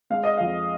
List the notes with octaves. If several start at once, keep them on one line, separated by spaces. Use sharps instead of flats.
G#3 F5
D#5
F2 F5